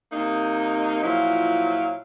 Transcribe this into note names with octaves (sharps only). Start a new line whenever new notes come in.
C3 A#3 D#4
A#2 F3 F#3 E4 F5